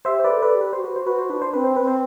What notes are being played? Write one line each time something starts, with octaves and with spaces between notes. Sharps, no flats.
G4 C5 E5
C5
B4 D5
A4
B4 D5
G4
B4
G4 C5
F#4 B4
C5
F#4 B4
C5
D4 B4
C5
C4 B4
C5
C4 B4
C5